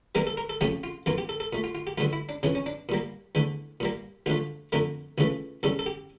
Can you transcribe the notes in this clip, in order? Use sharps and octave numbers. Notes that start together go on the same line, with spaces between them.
E2 E3 G3 A#3 A#4
A4
A#4
A4
F2 C#3 F3 A3 G4
F4
F2 E3 A#3 F4
G4
A4
A4
A#2 A3
F4
F4
G4
G2 D3 F3 A3 F4
E4
D4
F2 C#3 E3 C#4
C#4
D4
A#2 G3 A#3
E2 D3 A3
A#2 G3 A#3
D2 D3 F3 A3 F4
F2 D3 A3 A#4
C#2 C#3 E3 A3
E2 C#3 G3 A4
A4
G4